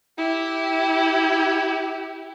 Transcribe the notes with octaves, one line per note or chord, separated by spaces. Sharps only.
E4 G4